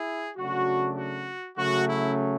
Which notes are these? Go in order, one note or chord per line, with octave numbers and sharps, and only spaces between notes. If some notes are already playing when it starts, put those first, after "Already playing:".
Already playing: E4 G#4
C#3 F#3 A3 D4 F#4
F#4
C#3 F#3 A3 C#4 F#4
E4